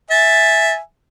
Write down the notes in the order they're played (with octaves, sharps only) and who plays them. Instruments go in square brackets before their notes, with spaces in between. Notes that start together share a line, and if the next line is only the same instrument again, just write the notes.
[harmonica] E5 G#5 [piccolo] A6